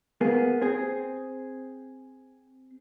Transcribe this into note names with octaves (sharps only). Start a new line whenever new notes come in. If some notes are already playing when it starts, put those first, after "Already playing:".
A#3 B3 G#4
C4 G#4